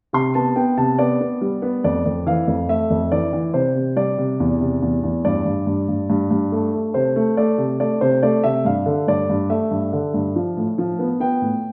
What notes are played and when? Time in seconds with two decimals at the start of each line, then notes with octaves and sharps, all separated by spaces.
0.13 C3 C6
0.35 B3 A5
0.56 B3 G5
0.77 C3 A5
0.98 B3 D5
1.21 B3
1.41 G3
1.62 B3
1.84 F2 D5
2.05 F2
2.26 E3 F5
2.48 F2
2.69 A3 E5
2.90 F2
3.12 E3 D5
3.33 E3
3.54 C3 C5
3.75 C3
3.96 G3 D5
4.18 C3
4.40 E2
4.61 C3
4.82 E2
5.03 E2
5.25 G2 D5
5.45 G2
5.67 G2
5.89 G2
6.10 G2
6.31 G2
6.52 A3
6.74 A3
6.94 C3 C5
7.16 A3
7.37 A3 D5
7.58 C3
7.80 A3 D5
8.01 C3 C5
8.23 A3 D5
8.44 C3 E5
8.65 G2 F5
8.86 D3
9.08 G2 D5
9.29 G2
9.50 A3 E5
9.71 G2
9.93 D3
10.14 G2
10.36 F3
10.57 A2
10.78 F3
10.99 B3
11.20 B3 G5
11.42 A2